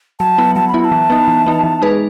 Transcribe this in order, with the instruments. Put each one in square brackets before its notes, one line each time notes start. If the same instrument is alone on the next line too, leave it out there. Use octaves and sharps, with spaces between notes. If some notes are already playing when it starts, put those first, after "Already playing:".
[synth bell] F#3 [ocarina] A5
[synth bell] B3 E4
[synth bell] F#3 [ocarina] A5
[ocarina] B5
[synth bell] B3 E4
[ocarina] B5
A5
[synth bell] E3
B3 D#4
E3
B3 D#4
E3
G#3 D#4 G#4 B4